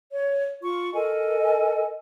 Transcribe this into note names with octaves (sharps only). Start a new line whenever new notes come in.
C#5
F4 C#6
A4 A#4 D#5 G#5